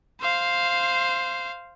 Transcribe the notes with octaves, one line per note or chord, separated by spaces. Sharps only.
C5 F5